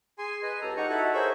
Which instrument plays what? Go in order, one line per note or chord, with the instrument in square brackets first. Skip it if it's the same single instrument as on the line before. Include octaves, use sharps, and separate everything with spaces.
[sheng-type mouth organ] G#4 G#5 C6
B4 D#5 G#5
[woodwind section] C#2 G4 [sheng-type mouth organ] A4 A#5
[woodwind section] D#4 F#5 [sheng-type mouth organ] G4 A#5 C#6
[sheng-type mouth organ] E4 F#4 A4
[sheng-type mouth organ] G#4 C#5 E5 [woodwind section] A#4 C5